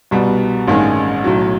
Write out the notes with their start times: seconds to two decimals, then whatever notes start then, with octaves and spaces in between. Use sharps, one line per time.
0.11 C2 B2 G3 B3
0.68 A1 G2 D#3 G#3 C#4
1.24 B1 A2 F#3